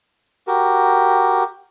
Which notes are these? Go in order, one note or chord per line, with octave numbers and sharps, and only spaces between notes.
F#4 G4 A#4